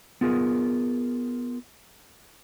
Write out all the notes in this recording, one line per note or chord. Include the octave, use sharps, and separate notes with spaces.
B3 F4 G#4 A#4